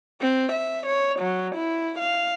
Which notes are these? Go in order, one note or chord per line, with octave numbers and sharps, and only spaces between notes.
C4
E5
C#5
F#3
E4
F5